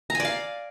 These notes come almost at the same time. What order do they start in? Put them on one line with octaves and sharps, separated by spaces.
A#5 G#5 D5 F5